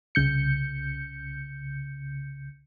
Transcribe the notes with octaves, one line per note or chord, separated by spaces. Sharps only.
C2 C#3 G6 C#7